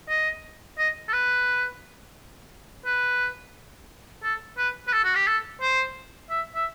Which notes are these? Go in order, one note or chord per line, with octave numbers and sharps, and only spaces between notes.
D#5
D#5
A4
B4
B4
A4
B4
B4
A4
F#4
G4
A4
C5
E5
E5